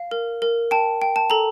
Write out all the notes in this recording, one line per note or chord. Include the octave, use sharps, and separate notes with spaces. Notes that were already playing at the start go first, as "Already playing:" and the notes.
Already playing: F5
A#4
A#4
G5 A5
G5
A5
A4 A#5